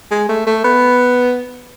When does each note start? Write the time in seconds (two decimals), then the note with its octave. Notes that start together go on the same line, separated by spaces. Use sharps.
0.11 G#3
0.29 A3
0.47 A3
0.64 B3